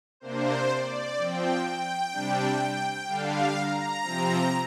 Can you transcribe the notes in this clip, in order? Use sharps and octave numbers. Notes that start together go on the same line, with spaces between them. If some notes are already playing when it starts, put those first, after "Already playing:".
C3 A#3 D4 C5
D5
F3 C4 G5
G5
C3 G3 D4
D3 G3 D4 F5
A#5
C3 F3 C4